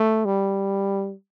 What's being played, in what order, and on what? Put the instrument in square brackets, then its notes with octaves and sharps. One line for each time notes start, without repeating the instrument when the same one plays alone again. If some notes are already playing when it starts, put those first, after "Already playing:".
Already playing: [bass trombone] A3
G3